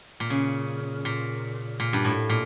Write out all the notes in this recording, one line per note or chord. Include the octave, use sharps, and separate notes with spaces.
A#2
C#3
A#2
A#2
G2
A2
A#2